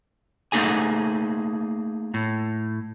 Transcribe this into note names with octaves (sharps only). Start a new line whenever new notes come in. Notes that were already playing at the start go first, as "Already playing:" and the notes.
A3 A#3 D#4 G#4 G#5
A2